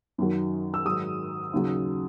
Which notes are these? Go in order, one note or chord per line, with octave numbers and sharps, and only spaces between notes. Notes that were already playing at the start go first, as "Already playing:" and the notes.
F#2 D#3 F#3
E6
G#2 D#3 F#3 D#6
D#2 C#3 F#3